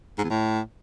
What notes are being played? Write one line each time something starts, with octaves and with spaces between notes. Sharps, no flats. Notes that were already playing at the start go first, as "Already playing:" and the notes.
G#2
E2
A2